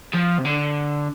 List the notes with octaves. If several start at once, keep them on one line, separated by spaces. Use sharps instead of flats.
F3
C3
D3